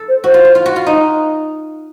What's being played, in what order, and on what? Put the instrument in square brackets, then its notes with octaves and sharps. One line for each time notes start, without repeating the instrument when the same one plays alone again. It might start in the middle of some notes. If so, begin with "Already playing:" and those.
Already playing: [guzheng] A4
[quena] C5
[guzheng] F#4 [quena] C5
[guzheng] F4
F4
F4
F#4
F4
D#4